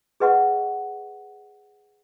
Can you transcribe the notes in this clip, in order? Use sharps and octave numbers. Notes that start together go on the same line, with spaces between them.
G#4 B4 D#5 F#5 C#6